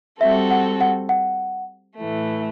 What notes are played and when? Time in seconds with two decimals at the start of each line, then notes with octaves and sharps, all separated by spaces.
0.21 G3 C4 F#4 A4 E5
0.51 F#5
0.81 F#5
1.09 F#5
1.98 A2 E3 A3